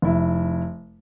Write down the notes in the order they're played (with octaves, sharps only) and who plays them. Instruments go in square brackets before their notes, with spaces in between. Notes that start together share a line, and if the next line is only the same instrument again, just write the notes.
[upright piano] F1 E4